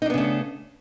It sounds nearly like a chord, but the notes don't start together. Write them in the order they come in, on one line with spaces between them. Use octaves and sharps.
D#4 D4 B3 C#3 A3